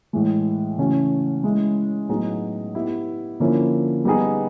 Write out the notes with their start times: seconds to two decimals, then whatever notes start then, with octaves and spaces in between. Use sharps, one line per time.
0.13 A2 E3 G#3
0.78 C#3 E3 A3 C#4 F#4
1.44 G#3 C#4 E4
2.09 A2 F#3 B3 D#4 G#4
2.75 B3 E4 G4
3.40 D3 F3 A#3 C#4 E4
4.05 G3 B3 D#4 G#4